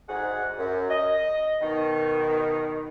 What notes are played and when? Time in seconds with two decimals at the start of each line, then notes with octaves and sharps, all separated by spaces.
0.09 D2 G#2 G#4 F#5
0.58 F#2
0.90 D#5
1.61 B2 D#3